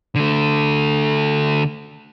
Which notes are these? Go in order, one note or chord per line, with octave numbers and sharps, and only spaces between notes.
D3 A3